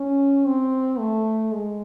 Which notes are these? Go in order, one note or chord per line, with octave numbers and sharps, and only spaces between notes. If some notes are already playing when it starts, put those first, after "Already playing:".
Already playing: C#4
C4
A3
G#3